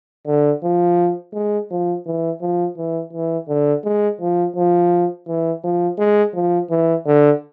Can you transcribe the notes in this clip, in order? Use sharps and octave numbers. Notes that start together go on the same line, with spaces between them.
D3
F3
G#3
F3
E3
F3
E3
E3
D3
G#3
F3
F3
E3
F3
G#3
F3
E3
D3